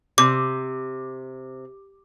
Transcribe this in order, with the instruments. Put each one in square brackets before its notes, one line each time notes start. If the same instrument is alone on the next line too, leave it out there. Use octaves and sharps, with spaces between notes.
[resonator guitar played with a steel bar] C3 [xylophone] D6